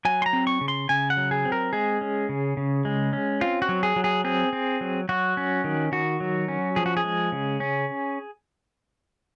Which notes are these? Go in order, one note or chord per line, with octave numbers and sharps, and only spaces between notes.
F#3 G#5
C6
A#5
C4
C#6
C#3
C6
C#3 G#5
F#5
F#3
G#4
C4
A#4
G#3 G#4
C#4
C#3
C#3
G#3
C#4
C4 F4
F#4
F#3
G#4
F#3
G#4
C4 G#4
C4
F#3
F#3 F#4
C#4
D#3
D#3 F#4
F#3
C#4
F3 G#4
F#4
G#4
G#3
C#3
C#4